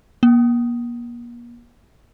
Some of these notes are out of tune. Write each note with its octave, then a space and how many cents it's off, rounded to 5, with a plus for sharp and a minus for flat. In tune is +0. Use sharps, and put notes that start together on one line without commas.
A#3 +40